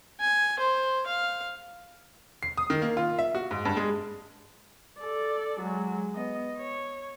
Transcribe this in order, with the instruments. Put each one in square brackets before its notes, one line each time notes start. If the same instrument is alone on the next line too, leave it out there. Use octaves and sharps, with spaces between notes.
[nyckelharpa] G#5
C5
F5
[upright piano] C7
D#6
D#3
A#3
F4
E5
F#4
G#2
G2
G#3
[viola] A4 D5
F#3 G#3
B3 D#5
C#5